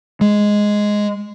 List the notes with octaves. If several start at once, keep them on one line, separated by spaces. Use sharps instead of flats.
G#3